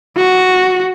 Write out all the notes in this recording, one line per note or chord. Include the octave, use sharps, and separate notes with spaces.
F#4